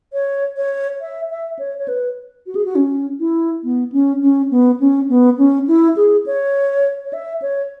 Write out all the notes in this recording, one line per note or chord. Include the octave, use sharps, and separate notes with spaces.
C#5
C#5
E5
E5
C#5
C#5
B4
F#4
G#4
F#4
C#4
E4
B3
C#4
C#4
B3
C#4
B3
C#4
E4
G#4
C#5
C#5
E5
C#5